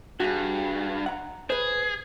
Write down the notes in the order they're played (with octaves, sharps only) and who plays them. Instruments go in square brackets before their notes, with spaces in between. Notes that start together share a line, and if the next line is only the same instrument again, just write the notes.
[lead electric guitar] G2 [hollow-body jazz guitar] F#4 G#4
[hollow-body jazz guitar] F#5 A#5
[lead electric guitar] G#4 [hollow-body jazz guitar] B4 C5